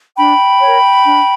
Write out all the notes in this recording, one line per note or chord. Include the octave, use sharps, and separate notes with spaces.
D4 G5 B5
A#4 C#5
D4